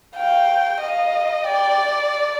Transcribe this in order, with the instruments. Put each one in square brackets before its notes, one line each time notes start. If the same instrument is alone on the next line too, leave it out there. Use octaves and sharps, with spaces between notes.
[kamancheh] F5 [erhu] G5
[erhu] D#5 [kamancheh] F5
[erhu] D5 [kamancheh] G5